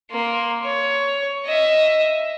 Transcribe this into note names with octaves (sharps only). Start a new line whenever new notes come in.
A#3 C6
C#5
D#5 E5